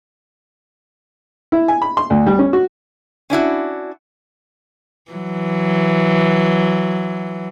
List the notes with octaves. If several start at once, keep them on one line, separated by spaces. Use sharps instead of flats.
E4
G#5
B5
C6
D2
G3
C#4
F#4
C#4 D4 E4 F#4
E3 F#3